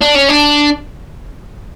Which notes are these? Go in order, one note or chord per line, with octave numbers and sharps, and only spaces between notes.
D4
C#4
D4